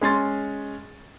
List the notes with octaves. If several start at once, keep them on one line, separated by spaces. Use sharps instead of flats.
G#3 C#4 C6 A6